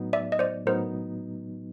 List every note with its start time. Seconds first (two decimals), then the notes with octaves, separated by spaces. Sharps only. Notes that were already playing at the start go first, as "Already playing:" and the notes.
Already playing: A2 F#3 B3 D#4
0.13 D5 E5
0.32 D#5
0.39 C5 D5
0.66 A2 F#3 B3 D#4 A#4 C5